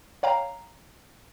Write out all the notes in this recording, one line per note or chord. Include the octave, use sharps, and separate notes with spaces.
C#5 F5 G5 A#5